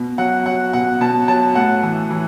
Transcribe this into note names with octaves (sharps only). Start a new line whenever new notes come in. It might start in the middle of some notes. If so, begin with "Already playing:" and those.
Already playing: B2
F#3 F#5
F#3 F#5
B2 F#5
B2 A5
F#3 A5
A2 F#5
E3
E3